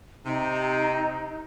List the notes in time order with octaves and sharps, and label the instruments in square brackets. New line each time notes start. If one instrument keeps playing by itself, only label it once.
[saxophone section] C3 [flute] D#4